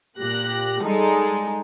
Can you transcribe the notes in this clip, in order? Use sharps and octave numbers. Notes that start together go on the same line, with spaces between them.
A#2 G4 F#6 A#6
G3 G#3 D#4 A4